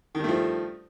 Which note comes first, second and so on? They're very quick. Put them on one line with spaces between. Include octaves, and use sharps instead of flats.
D#3 G2 A3 F3